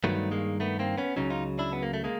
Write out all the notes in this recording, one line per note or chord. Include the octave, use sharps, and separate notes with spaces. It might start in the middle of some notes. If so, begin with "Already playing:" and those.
G2 D#3 F#3 A3 B3
G#3 A#3
A3 B3
A#3 C4
B3 C#4
C#2 C#3 F#3 C#4 D#4
D#4 F4
D4 E4
B3
A#3
A3
G#3 A#3